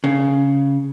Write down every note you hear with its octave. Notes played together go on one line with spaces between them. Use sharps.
C#3